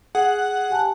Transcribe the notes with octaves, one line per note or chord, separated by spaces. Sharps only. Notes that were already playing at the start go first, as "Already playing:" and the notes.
G#4 F#5
G4 G#5 A5